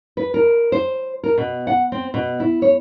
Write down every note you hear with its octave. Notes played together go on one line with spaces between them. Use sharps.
B4
A#4
C5
A#4
B2
F#5
C4
B2
E4
C#5